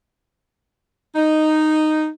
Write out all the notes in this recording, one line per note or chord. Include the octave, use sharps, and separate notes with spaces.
D#4